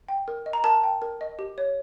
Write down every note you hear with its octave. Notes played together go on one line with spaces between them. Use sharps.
G5
A#4
D#5
A#5
A#4 A5
G5
A#4
D#5
G4
C#5